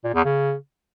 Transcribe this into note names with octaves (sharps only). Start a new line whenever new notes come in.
A#2
E2
C#3